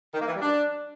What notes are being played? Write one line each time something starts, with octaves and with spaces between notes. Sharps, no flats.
D#3
A#3
E3
G3
D4